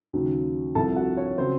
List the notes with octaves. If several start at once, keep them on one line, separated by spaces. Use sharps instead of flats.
D#2 C#3 F#3
C2 C3 F3 A4 A5
F#4 F#5
C#5
C#3 F#3 C4 C5